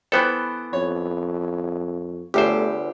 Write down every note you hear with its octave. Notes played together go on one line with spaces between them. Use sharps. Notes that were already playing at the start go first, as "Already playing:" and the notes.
E3 B3 A4 C5 G5
F2 C#5
G1 E2 A3 G4 C5